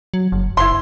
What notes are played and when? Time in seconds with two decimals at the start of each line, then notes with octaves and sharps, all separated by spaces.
0.14 F#3
0.32 F#1
0.57 F#1 E4 C6